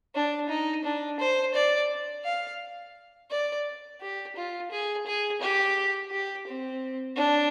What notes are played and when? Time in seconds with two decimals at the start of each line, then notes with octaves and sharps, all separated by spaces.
0.14 D4
0.49 D#4
0.85 D4
1.20 C5
1.54 D5
2.24 F5
3.31 D5
4.01 G4
4.36 F4
4.71 G#4
5.06 G#4
5.41 G4
6.11 G4
6.47 C4
7.17 D4